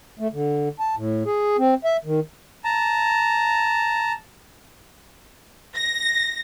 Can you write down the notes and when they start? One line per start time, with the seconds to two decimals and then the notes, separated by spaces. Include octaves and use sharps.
0.19 A3
0.33 D3
0.79 A5
0.96 A2
1.26 G#4
1.58 C4
1.84 E5
2.05 D#3
2.64 A5 A#5
5.76 A#6